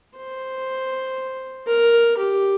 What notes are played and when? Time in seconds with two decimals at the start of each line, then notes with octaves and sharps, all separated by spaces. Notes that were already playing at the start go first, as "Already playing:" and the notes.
0.17 C5
1.67 A#4
2.17 G4